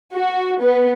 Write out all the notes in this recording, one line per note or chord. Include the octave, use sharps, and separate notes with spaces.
F#4
B3